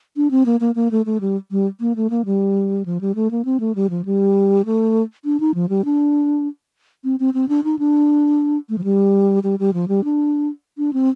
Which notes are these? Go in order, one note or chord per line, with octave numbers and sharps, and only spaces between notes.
D4
C4
A#3
A#3
A#3
A3
A3
G3
G3
A#3
A3
A#3
G3
F3
G3
A3
A#3
C4
A3
G3
F3
G3
A3
D4
D#4
F3
G3
D4
C4
C4
C4
D4
D#4
D4
A3
F3
G3
G3
G3
F3
G3
D4
D4
C4